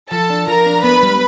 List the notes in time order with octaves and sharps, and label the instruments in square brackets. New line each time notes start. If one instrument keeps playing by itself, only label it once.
[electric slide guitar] F3 [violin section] A4 A5
[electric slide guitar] D4
[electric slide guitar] F3 [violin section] A#4 A#5
[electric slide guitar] D4
[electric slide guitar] B3 [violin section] B4 B5
[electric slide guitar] G3